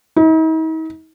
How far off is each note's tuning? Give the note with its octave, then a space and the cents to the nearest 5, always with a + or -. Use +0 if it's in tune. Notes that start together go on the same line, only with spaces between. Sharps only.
D#4 +45